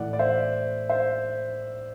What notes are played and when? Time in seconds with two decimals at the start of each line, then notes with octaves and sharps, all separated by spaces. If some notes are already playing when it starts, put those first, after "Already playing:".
Already playing: A2 E3 D5 F#5
0.13 D5
0.19 C5 E5
0.89 C5 E5